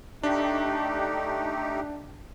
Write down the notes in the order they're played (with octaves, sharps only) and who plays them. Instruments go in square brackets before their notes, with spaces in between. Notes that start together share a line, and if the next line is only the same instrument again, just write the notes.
[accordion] A3 D#4 G4 [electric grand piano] D4